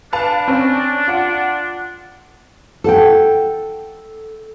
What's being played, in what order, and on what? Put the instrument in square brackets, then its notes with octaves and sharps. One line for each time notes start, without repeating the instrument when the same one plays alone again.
[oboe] D4 [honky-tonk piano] B4 F5 A5
[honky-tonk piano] C4 C#4
F4 F#5
[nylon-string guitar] A4 F#5 G5